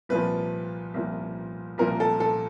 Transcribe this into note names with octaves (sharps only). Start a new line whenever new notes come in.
C2 A#2 F3 B4
C2 A#2 F3
C2 A#2 F3 A#4
A4
A4